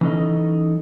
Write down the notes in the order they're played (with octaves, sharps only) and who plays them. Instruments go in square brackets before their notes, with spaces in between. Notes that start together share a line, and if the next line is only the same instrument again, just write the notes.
[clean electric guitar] E3 F#3 C#4 D#4 A4 D#5